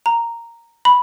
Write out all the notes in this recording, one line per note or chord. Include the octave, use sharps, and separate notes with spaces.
A#5
B5